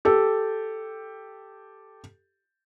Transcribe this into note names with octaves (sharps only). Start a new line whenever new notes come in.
G4 A4